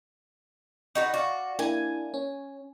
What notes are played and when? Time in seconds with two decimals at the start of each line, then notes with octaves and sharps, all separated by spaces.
0.95 D#4 F#4 B4
1.14 F#4 D5 F5 C#6
1.59 A#3 D4 E4 G#5
2.14 C#4